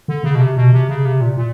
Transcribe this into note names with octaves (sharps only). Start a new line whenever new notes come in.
D3
C#3
B2
C3
B2
C3
C#3
C3
A#2
A#2